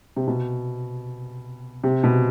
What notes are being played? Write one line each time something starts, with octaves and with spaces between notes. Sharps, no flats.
C3
B2
C3
B2